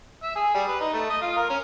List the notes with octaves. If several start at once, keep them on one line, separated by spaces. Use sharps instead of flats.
E5
G#4
G3
B4
D#4
A3
D#5
F4
A#4
C#4